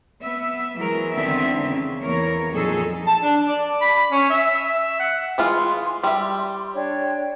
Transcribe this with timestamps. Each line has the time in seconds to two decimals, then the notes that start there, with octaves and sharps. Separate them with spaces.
0.20 B3 E5
0.77 E3 F#3 G#3 A#4
1.11 E2 D3 D#3 B3 C4 E5
1.68 C#3
2.02 E2 E3 A#3 A#4 C#5
2.51 F2 A#2 F#3 D#4 G#4 A4
3.07 A5
3.22 D4
3.47 D5
3.82 B5
4.12 C#4
4.30 E5
4.67 E5
5.00 F#5
5.38 E3 G#3 F4 C6
6.03 G3 E5
6.74 D4 C#5 G5